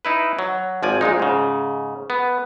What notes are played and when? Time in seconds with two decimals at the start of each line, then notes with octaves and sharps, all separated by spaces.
0.05 D#4 E4 B4
0.39 F#3
0.83 G#1 F3 D5 G#5
1.01 A#1 A#2 G#3 D#4
1.20 G#2 C#3
2.10 B3